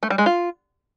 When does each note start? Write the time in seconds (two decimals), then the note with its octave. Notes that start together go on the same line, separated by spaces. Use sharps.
0.03 A3
0.10 G3
0.18 G#3
0.26 F4